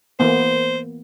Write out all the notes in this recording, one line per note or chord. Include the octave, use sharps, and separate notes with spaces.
E3 A#3 B3 C5